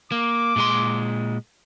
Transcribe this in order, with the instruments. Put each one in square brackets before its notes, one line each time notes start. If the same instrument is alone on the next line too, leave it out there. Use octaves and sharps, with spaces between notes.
[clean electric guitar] A#3 [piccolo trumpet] D6
[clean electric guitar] A#2 G#3 C6